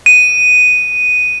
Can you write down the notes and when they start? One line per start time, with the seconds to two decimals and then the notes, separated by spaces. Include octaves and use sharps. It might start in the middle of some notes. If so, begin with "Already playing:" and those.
0.06 D#7